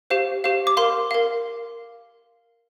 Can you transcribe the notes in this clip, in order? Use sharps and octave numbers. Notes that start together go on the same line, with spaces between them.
G4 C5 F5
G4 C5 F5
D6
A#4 F5 C6
A#4 F5